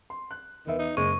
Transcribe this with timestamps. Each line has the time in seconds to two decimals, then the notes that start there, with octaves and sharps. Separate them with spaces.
0.10 C6
0.31 F#6
0.67 E2 D#3 B4 E5
0.79 D#4
0.97 F#1 G#3 C#6